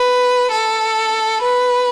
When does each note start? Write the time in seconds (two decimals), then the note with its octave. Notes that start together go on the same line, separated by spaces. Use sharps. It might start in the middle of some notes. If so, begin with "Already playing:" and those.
Already playing: B4
0.52 A4
1.42 B4